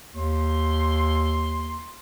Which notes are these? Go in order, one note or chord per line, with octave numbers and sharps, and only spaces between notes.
D#2 C6